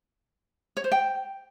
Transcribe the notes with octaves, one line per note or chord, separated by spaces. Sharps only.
C#5
C5
G5